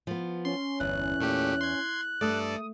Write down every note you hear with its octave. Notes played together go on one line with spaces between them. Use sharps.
F3 B3
C#4 C6
G1 E2 F#6
A#2 A3 G4
C6 G#6
G2 A3 A4 D5 D#6